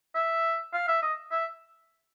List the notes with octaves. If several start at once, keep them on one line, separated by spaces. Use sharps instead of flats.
E5
F5
E5
D#5
E5